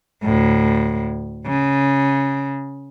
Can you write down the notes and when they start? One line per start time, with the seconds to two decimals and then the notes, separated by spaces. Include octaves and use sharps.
0.23 D2 A2
1.46 C#3